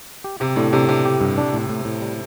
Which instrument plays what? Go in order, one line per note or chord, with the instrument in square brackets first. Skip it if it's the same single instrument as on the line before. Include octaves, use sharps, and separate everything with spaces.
[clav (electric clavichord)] G4
[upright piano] C3 [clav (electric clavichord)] G4
[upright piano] A2 [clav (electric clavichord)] D4
[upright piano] C3 [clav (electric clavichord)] D4
[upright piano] C3 [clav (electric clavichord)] D4
[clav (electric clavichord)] G4
G2
D4
A2
A2
A2
G3